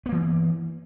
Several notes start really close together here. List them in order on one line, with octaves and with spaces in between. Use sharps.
B3 A#3 E3